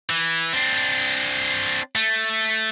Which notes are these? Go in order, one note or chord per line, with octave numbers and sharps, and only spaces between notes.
E3
C4 D4
A3